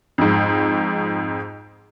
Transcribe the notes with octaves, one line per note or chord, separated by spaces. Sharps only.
F2 G#2